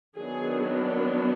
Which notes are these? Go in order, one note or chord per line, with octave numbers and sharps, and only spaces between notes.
D#3 F#3 B3 D4 G#4